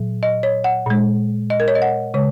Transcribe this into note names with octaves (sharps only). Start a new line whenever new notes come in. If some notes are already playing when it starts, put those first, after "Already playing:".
Already playing: A#2 F#3
D#5
C#5
F#5
A#2 G#3
D#5
A#4
C#5
D#5
F#5
C#3 G#3 C#5